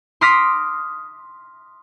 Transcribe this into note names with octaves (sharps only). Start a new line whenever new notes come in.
C6 D6 D#6 F6 A#6 B6